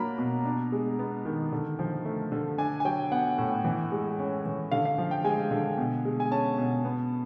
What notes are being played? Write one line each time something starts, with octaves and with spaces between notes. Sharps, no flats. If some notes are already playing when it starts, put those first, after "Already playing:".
Already playing: F#3 A#3 D4 A#5 B5
B2
D4
G#3
B3
D#3
D3
F3
A3
D3
D4 G#5
G#5
F#3 G5
B3 F#5
A2
E3
G#3
C#4
E3
D3 F5
F5
F3
G5
G#3 G#5
D3
B2
G#3
G#5
C#4 A5
B2
B3